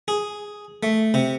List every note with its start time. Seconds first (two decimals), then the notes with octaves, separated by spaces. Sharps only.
0.08 G#4
0.83 A3
1.14 C3